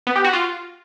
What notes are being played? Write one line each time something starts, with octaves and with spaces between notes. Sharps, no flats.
B3
G4
F#4
F4